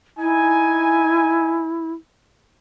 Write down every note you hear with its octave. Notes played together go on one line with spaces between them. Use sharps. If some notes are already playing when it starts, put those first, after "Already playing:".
D#4 E4 G#5